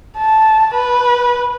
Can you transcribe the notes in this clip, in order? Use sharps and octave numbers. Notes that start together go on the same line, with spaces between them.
A5
B4